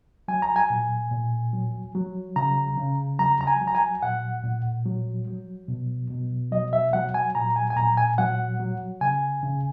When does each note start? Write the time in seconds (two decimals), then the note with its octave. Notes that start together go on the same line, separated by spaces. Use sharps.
0.28 F#3 G#5
0.42 A#5
0.56 G#5
0.70 A#2
1.11 A#2
1.53 F#3
1.95 F#3
2.36 C#3 A#5
2.78 C#3
3.19 F#3 A#5
3.41 A#5
3.47 G#5
3.61 F#3
3.67 A#5
3.75 G#5
4.03 A#2 F#5
4.44 A#2
4.86 F#3
5.27 F#3
5.68 B2
6.10 B2
6.52 F#3 D#5
6.73 E5
6.93 F#3 F#5
7.14 G#5
7.35 A#2 A#5
7.56 G#5
7.70 G#5
7.77 A#2 A#5
7.97 G#5
8.18 F#3 F#5
8.60 F#3
9.01 C#3 G#5
9.43 C#3